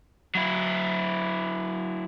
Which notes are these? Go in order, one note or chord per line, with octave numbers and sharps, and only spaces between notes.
F#3 E4